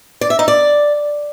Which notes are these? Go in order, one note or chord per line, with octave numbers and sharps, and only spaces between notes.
D5
E5
D#4
D5